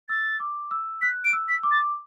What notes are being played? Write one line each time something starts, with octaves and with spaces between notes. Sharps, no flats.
E6 A6
D6
E6
F#6 B6
D7
E6
B6
D6
A6